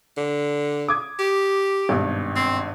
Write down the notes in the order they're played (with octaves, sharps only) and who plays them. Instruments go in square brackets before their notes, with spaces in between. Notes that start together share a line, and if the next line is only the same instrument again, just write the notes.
[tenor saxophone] D3
[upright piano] D6 D#6 G#6
[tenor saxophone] G4
[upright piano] G#1 G2 B2
[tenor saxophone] C4